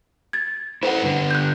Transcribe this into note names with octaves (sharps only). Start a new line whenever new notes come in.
G#6 A6
E4 A4 B4 C5 F#5
G2 D3
F#6 G6